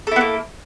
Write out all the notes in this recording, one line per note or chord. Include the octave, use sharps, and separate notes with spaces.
A#3 B3 E4 A4